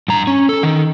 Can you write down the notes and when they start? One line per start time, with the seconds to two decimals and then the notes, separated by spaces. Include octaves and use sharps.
0.08 G2 A#5
0.27 C#4
0.49 A4
0.63 D#3